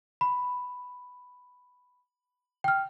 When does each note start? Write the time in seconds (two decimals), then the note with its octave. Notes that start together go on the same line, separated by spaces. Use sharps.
0.21 B5
2.64 G5 F6